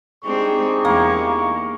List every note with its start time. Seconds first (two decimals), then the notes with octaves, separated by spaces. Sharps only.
0.24 G#3 C4 D4 D#4 G4 G#4 C#6
0.85 E2 G#3 A#3